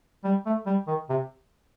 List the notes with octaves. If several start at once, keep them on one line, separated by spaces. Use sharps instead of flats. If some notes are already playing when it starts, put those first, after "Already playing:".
G3
A3
G3
D#3
C3